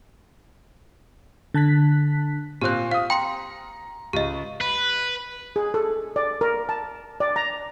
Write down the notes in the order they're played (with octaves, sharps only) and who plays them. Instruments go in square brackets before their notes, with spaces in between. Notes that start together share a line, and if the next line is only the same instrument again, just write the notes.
[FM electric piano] D3 A5 F#6 B6
[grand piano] A#2 C4 F5 [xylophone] G4 F#6
[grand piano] F4 D#6 [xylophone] F5
[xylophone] G5 C6 C#7 [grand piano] A#5
[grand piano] C#2 [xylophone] G4 D#5
[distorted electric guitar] B4
[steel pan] G#4
A4
D5
A#4
A5
D5
A#5